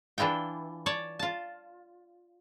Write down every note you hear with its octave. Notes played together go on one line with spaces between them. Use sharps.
E3 D4 E4 F4 G5
C#5 D5 A5
F4 A5